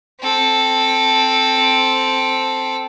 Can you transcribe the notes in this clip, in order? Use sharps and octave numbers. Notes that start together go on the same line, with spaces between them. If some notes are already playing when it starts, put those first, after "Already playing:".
C4 A4